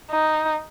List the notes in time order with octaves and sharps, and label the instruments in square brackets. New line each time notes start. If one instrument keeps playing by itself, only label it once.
[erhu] D#4